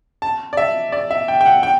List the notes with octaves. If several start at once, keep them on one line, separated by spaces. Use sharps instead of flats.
A5
D5
E5
D5
E5
G5
G5
F#5
G5